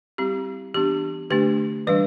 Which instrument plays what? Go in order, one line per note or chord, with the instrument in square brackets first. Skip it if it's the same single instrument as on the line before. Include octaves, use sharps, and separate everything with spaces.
[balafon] G3 C4 E4 G4
E3 B3 D4 G4
D3 A3 D4 G4
E3 G3 D4 B4